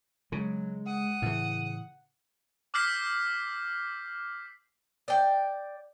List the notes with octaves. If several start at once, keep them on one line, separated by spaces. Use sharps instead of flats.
C#3 F#3 G#3
F#5 D#6
A2 C#3 E3
D6 E6 F6 G6 B6 C7
D5 G5